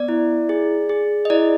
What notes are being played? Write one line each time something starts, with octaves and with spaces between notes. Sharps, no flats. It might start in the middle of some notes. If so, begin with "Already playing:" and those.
Already playing: B3 D5
E4
G#4
G#4
D#5
E4 D5